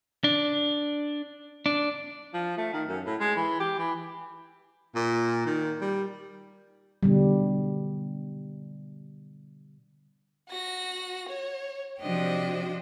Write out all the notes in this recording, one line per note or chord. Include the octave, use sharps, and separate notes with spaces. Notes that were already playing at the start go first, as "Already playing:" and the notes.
D4
D4
F3
A3
D#3
F#2
A2
G#3
E3
G4
E3
A#2
D#3
G3
B2 D3 G3
F#4 A#6
C#5
C3 F3 D4 F#4 D#5 G5